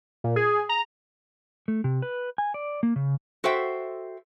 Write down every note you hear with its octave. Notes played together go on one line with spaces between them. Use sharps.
A#2
G#4
A#5
A3
C3
B4
G#5
D5
A#3
C#3
F#4 A4 C5 E5 G5